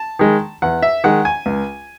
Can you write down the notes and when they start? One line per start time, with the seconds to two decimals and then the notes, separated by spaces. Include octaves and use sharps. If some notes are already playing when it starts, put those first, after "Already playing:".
Already playing: A5
0.19 D#3 G#3
0.62 E2 F#5
0.82 E5
1.04 D#3 G#3 F#5
1.25 G#5
1.46 C#2